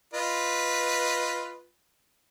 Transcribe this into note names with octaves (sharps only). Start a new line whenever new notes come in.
F4 B4 D#5